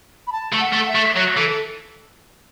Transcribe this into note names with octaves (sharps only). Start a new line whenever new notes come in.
B5
A5
A3
F#5
A3
E5
A3
F#3 C#5
E3 A4
A4